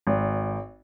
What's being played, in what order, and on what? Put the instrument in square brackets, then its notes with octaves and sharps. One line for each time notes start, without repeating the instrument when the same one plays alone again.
[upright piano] G#1